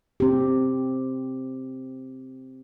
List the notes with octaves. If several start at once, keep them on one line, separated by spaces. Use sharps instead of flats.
C4 G4